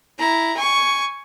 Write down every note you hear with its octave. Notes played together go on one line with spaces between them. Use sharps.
E4 A#5
G#5 C#6